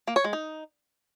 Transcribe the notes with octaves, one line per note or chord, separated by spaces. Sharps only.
A#3
C#5
G#3
D#4